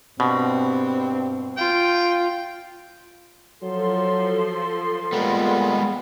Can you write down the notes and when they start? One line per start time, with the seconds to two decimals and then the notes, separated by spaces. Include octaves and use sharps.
0.20 G2 B2 C4
1.58 F4 G5
3.63 F3 F#3 A4 C6
5.13 A#2 G3 G#3 B3